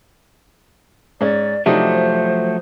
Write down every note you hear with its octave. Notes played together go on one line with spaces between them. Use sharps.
G#2 C#4 D5
C3 F3 F#3 A3 D4 D#4 C5